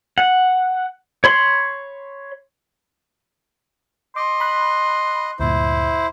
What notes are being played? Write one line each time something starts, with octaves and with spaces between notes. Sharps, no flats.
F#5
C#5 B5 C6
D#5 C6 D6
B5 F#6
D2 G2 A#2 E4 C5